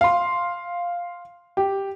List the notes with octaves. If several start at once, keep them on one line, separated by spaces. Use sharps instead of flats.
F5 C6
G4